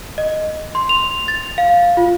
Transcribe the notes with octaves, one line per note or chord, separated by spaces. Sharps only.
D#5
C6
F7
A6
F5
F4